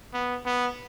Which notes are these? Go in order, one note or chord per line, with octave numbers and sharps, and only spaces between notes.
B3
B3